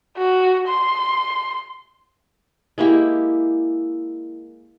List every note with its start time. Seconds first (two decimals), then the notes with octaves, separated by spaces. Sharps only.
0.18 F#4
0.68 C6
2.78 G#3 A#3 E4 G4